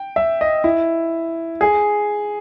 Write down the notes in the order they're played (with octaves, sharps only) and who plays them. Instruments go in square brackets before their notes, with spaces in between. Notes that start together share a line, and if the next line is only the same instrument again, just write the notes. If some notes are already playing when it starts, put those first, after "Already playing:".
Already playing: [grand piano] G5
E5
D#5
E4
G#4